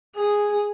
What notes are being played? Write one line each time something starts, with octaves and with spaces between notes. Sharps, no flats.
G#4